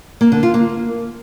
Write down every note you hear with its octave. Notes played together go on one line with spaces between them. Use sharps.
A#3
D3
F4
A#3